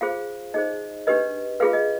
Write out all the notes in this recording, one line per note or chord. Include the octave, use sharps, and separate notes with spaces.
F4 G#4 C5 F5
D#4 G#4 C5 D#5
D4 G4 B4 D#5
F4 G#4 B4 F5
D#5